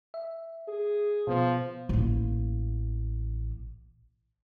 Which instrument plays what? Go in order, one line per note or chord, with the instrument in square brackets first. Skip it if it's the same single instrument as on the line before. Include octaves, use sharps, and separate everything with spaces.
[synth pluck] E5
[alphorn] G#4
[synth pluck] B2 B3 [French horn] F3
[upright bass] A1 A#3